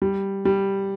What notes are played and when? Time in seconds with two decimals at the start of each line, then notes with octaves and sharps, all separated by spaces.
0.02 G3
0.45 G3